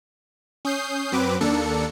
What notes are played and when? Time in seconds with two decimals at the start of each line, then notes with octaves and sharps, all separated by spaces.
0.65 C#4 D#6 G6 C7
1.12 F#2 F#3 C4 B4 D6
1.41 D#2 A#3 D4 A4 C#7